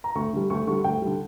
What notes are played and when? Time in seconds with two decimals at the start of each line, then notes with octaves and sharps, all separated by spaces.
0.04 A#5
0.15 D2 C#6
0.33 D3 G3
0.50 D2 C#6
0.67 D3 G3 C#6
0.84 D2 G5
1.02 D3 G3